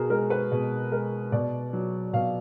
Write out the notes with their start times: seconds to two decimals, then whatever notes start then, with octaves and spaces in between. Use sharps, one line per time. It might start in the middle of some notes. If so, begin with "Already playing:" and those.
Already playing: B2 F#4 G#4 A#4
0.10 G#3 A#4
0.30 B4
0.51 B2 G#4
0.92 G#3 A#4
1.32 B2 D5
1.73 F#3
2.13 B2 F5